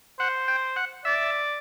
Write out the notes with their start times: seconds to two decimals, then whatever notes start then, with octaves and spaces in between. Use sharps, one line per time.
0.19 C5 F#5
0.48 G5
0.76 F#5
1.05 D5 E5